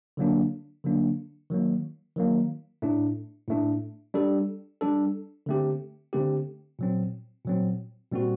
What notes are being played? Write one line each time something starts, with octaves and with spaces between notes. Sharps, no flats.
D3 F#3 A#3 D4
D3 F#3 A#3 D4
D#3 F#3 A#3
D#3 F#3 A#3
A2 A3 D4
A2 A3 D4
G3 D4 A4
G3 D4 A4
D3 A3 C4 G4
D3 A3 C4 G4
A#2 F#3 C4
A#2 F#3 C4
A#2 G3 C4 F#4